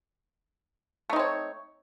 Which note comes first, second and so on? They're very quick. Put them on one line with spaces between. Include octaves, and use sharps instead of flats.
A3 D#4 C4 C#5